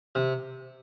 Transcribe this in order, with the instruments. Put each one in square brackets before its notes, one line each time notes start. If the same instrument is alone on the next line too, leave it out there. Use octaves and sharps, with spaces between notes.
[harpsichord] C3